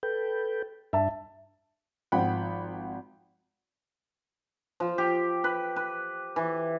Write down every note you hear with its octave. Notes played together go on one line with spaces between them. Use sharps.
A4 B4 G5
G2 D4 E5 A5
G#1 F3 F#5 G5 B5
F3
G4
B4
B4
E3